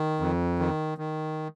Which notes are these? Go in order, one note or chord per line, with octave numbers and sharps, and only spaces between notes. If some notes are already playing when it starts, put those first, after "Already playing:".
Already playing: D#3
F2
D#3
D#3